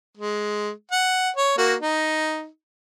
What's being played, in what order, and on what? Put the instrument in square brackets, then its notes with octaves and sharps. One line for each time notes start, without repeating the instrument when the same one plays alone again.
[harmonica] G#3
F#5
C#5
A#3 F#4
D#4